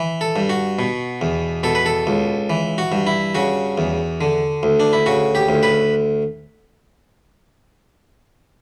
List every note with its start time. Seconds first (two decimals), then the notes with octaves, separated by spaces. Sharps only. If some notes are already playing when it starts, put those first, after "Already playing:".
Already playing: E3
0.21 A4
0.36 G2
0.50 F#4
0.79 B2
1.21 E2
1.63 B2 A4
1.75 B4
1.86 A4
2.07 C#2
2.50 E3
2.78 F#4
2.92 G2
3.07 E4
3.35 C#3 F#4
3.78 E2
4.21 D3
4.63 D2
4.80 D4
4.93 E4
5.06 C#3 F#4
5.35 G4
5.49 D2
5.63 B4